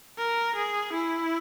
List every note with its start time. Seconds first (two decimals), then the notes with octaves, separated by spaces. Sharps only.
0.18 A#4
0.55 G#4
0.93 E4